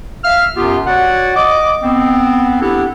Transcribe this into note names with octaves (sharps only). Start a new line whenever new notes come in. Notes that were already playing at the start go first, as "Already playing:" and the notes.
E5 F5 F6
F#2 C3 B3 F4 G4
F#4 C#5 D5 F#5
D#5 D6
B3 C4
B3 C4 D4 E4 G4 A4